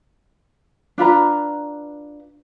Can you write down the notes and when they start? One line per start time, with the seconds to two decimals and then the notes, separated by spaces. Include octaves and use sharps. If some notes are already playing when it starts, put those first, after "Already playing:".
0.98 D4 F4 B4 A#5